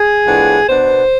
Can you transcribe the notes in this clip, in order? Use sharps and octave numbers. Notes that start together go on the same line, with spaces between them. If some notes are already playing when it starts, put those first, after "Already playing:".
Already playing: G#4
A2 F3 B3 D4
B2 B3 D4 C5